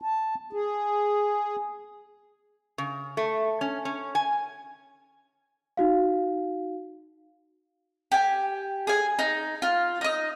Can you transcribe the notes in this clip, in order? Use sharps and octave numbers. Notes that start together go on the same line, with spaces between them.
A5
G#4
C#3
A3
C#4
C#4
G#5
D#4 F#4 F5
G4 G#5
G#4 G#5
D#4
F4
D#4 D#5